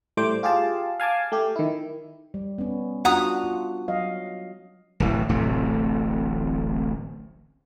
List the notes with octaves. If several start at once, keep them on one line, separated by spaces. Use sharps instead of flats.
A2 G3 A3 C5 D6
F4 G4 G#4 F5 A5
F5 G#5 A5 D6
A3 G4
D#3 E4
G3
B3 C#4
D4 F4 F#4 F#5 A#5 D#6
F4
F#3 D#5 F5
D1 A1 E3
D1 A1 C3 A3